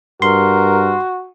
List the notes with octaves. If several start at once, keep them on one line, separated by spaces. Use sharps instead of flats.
G2 F#4 A#4 C6